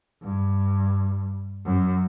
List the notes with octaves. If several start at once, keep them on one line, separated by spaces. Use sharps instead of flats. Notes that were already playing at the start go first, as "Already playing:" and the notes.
G2
F#2